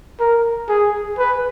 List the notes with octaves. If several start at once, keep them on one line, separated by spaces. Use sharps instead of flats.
A#4
G#4
B4